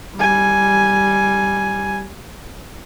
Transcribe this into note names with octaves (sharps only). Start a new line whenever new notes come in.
G3 G#5